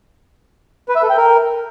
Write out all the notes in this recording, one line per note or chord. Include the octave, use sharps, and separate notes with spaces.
B4
E5
A4
G5
A#4